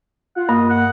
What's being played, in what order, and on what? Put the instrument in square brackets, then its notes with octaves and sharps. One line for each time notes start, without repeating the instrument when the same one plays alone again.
[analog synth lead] F4 [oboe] F#5
[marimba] G2 [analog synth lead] A#3 [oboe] D#5
[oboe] F#5